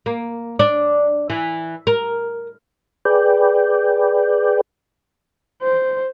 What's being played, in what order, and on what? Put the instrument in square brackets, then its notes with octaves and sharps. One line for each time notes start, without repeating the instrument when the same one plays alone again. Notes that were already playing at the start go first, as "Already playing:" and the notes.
[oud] A#3
D4
E3
A#4
[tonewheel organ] G#4 B4 D5 G5
[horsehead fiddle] C5